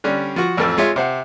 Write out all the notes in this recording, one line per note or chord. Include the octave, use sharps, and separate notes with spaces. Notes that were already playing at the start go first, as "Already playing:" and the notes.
D3 G3 C#4
F3 F#4
A1 F2 C4 A4 E6
G#3 F4 C#5 E5
C3 C5 F#5